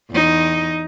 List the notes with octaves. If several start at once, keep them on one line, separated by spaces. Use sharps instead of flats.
E2 D#4